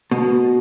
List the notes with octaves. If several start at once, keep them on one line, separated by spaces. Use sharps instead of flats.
B2